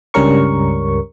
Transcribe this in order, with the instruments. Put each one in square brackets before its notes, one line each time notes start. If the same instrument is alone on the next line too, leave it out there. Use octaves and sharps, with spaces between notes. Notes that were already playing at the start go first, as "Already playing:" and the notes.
[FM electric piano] C#2 G2 G3 C#4 A#4 C#6